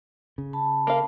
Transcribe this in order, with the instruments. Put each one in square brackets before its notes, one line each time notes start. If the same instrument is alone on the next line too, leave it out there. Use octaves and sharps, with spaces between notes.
[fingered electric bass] C#3
[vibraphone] A5 B5
[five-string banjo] A#3 F5